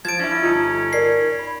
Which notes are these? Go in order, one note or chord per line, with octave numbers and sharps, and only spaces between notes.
F3 A5 G#6 D7
C#4 D4 E4
G1 D#4 F4 A4
A#4 D5 C7
B5